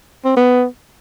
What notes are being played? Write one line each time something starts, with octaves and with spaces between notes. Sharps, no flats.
C4
B3